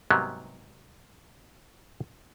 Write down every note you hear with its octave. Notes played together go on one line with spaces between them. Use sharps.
G#2 C3 F#3 G3 A#3 B3